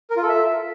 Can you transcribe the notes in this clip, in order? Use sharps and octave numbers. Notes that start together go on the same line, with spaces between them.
A#4
F4
A4
E5